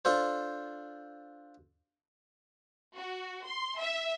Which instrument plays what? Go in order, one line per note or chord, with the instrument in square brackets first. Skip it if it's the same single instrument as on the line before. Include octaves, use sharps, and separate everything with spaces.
[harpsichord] D4 F4 A4 C5
[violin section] F#4
C6
E5